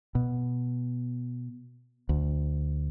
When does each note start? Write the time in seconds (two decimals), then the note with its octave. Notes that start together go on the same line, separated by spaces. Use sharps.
0.15 B2
2.09 D2